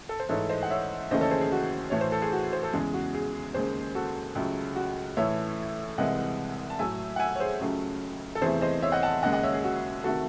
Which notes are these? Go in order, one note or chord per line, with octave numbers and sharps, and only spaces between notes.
A4
C5
G#2 E3 A3 A4 C#5
C5 D#5
F#5
C#5 E5
D#2 C#3 E3 A3 C5 D#5
A4 C#5
G#4 C5
G#4
F#4
A2 E3 A3 C#5
C5
A4
G#4
F#4
C5
A4
E2 C#3 G#3 G#4
F#4
G#4
D#2 C#3 G#3 G#4 C5
F#4 A4
C#2 C#3 F#3 A3
F#4
A2 E3 A3 C#5 E5
C2 C3 E3 G#3 D#5 F#5
A5
A2 F#3 A3 E5 G#5
F#5
E5 G#5
C#5
G#4 C5
C#2 C#3 F#3 A3
A4
E2 C3 E3 A3 G#4 C5
C5 D#5
C#5 E5
D#5 F#5
F#5 A5
D#2 C#3 G#3 D#5 F#5
D#5 F#5
C#5 E5
G#4
F#4
C3 D#3 A3 F#4 A4